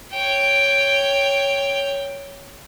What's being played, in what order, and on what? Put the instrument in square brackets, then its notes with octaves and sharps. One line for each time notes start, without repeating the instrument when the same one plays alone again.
[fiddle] C#5 G5